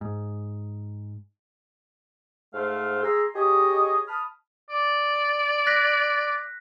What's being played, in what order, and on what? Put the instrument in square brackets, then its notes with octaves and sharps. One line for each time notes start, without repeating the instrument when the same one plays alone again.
[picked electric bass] G#2
[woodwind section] G#2 A3 C5 F5
G#4 G#5 A#5 C6 E6
G4 G#4 C#5 D#5
A5 B5 D#6 F6
[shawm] D5
[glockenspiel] F#6 A#6 B6